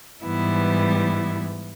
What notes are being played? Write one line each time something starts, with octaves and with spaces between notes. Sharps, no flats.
G#2 E3 G3 B3 E4